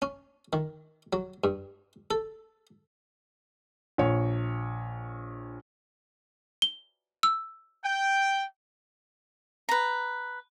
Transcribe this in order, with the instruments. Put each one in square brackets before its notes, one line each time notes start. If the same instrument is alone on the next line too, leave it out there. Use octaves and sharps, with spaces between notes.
[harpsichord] C#4
D#3
F#3
G2
A4
[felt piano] A#1 C#5
[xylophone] G7
E6
[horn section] G5
[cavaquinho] B4 A#5